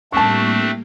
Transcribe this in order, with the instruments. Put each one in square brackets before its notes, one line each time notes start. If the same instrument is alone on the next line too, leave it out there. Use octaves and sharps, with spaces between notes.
[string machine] A2 G3 A#3 [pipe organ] A3 C4 D4 [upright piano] A5 C#6